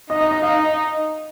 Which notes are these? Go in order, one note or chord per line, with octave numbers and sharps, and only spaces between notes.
D#4 D#5
D#5
D#5
D#4 F5
D#5